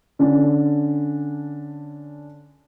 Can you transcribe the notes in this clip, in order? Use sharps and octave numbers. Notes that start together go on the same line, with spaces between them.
D3 C#4 D4